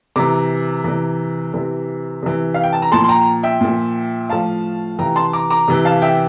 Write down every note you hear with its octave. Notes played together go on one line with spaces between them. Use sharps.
C3 E3 A#5 D6
C3 E3
C3 E3
C3 E3
F5
G5
A5
A#5
A#2 F3 A5 C6
C6
G5 A#5
E5 G5
A#2 F3
A2 F3 F5 A5
C3 E3 G5 A#5
A5 C6
A#5 D6
A#5 D6
C3 E3
F5 A5
E5 G5